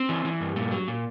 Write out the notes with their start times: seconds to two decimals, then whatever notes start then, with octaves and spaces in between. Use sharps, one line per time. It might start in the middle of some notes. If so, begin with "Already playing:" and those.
Already playing: C4
0.09 E3
0.25 E3
0.40 G2
0.56 A#2
0.71 F#3
0.88 A#2